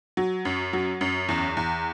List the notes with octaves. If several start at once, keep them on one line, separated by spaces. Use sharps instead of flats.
F#3
F#2
F#3
F#2
E2
E2